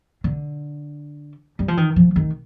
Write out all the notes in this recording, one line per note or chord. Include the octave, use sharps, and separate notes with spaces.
D3
G3
F3
D#3
F3
D#3